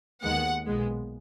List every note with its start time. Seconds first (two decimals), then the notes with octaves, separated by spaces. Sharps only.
0.23 D#2 D#3 G#3 B3 F#5
0.66 B1 A#2 G#3 B3